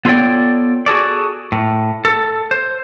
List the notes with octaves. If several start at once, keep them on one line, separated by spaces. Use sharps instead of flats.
B3 F4 A4 C#5 D5 G5
F#4 G#4 A4 D5
A2
A4
C5